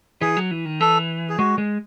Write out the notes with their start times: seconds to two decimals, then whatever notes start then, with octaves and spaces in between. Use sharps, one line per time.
0.21 E3 G#4
0.37 F#3
0.51 E3
0.65 D#3
0.80 E3 A4
1.29 G#4
1.39 G#3 F#4
1.58 G#3